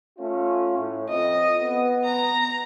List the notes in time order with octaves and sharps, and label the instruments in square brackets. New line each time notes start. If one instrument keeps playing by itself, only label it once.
[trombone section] A3 C#4 F4
A2
[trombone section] F2 [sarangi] D#5
[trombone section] B3
[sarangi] A#5